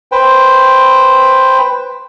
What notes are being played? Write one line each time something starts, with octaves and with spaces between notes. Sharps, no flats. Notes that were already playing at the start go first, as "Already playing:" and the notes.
B4 C5 G5